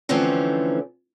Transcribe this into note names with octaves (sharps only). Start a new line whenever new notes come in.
D3 E3 F3 A3 C4 C#4